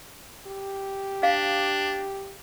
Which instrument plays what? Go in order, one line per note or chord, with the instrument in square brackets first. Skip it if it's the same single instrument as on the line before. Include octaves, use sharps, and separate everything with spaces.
[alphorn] G4
[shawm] D4 [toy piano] F5